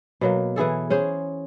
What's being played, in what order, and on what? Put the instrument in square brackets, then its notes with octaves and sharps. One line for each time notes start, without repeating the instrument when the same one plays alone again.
[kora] B2 F#3 A#3
E3 E4 G#4 A4
C#4 G#4 C5